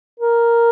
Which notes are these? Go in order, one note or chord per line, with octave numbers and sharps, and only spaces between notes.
A#4